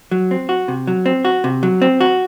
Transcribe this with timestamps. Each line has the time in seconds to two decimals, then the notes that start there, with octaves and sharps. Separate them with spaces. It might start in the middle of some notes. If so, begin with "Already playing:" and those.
0.11 F#3
0.31 C4
0.49 F#4
0.68 C3
0.87 F#3
1.06 C4
1.25 F#4
1.44 C3
1.63 F#3
1.82 C4
2.01 F#4